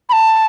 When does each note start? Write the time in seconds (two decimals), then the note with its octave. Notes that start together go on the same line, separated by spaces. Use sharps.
0.09 B5
0.13 A5